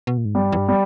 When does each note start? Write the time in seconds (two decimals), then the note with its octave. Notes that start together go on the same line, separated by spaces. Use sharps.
0.07 B2
0.17 A#2
0.25 G#2
0.35 G2 G3
0.52 E2
0.57 G2
0.68 G3